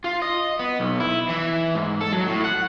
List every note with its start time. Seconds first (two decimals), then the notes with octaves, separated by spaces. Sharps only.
0.04 F4
0.22 D#5
0.59 B3
0.80 B1
1.00 E4
1.29 E3
1.75 G#2
2.01 A4
2.13 F#3
2.29 A2
2.45 F#5